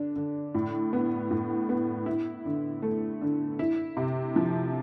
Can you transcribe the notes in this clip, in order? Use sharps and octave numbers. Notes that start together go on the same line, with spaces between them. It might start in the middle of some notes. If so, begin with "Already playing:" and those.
Already playing: D3 D4
D3
A2
B3
A2
B3
E4
D3
A3
D3
E4
C3
F3